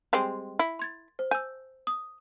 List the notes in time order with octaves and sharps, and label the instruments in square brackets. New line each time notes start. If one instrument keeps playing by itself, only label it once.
[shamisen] G3 G#3 C4
E4
[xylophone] C6 G#6 A6
C5
[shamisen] G#5 [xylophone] E6 G6
[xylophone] D#6